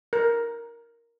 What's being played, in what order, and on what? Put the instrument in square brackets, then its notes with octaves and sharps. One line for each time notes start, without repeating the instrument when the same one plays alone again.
[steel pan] A#4